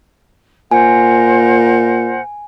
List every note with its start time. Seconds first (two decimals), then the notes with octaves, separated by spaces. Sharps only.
0.71 A#2 A#4 C5 F#5 G#5